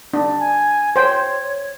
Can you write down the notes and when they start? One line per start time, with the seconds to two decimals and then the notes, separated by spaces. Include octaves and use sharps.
0.13 D4
0.39 G#5
0.96 C5 C#5 G5